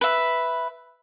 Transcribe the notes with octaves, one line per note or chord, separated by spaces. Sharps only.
B4 E5